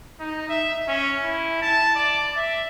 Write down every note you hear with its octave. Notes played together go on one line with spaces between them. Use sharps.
D#4
E5
C#4
E4
A5
D5
E5